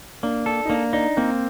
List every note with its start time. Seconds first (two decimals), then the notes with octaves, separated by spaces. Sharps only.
0.23 A#3 D4
0.46 D4 A4
0.65 D#4
0.70 A#3 D4
0.93 D4 D#4
1.17 A#3 C4